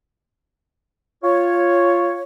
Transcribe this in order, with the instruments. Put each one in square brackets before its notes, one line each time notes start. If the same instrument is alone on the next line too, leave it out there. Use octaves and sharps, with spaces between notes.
[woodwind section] F4 C#5